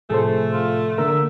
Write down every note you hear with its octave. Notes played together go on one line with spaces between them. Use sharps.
A2 C3 F3 A3 G#4 A4 C5
F4
D3 A#3 A#4 E5